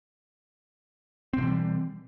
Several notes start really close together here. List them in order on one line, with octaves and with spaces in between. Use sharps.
C4 B2 E3 G3